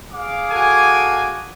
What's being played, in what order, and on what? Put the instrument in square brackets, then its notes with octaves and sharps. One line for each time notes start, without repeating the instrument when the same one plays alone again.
[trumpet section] G#4 F5 D6
[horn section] F#4 A4 G#5